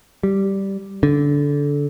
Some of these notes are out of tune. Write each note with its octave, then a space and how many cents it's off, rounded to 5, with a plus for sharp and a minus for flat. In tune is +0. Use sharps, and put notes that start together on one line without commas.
G3 -5
D3 -20